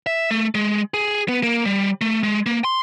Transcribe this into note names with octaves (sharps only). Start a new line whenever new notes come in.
E5
A3
G#3
G#4
B3
A#3
G3
A3
G#3
A#3
C6